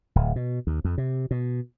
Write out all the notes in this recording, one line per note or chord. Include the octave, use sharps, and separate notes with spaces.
D1
B2
D#2
F2
C3
B2